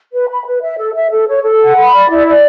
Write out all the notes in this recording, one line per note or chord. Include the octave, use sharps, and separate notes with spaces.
B4
B5
B4
E5
A4
E5
A4
C#5
A4
F#5
B5
D5
E4
D5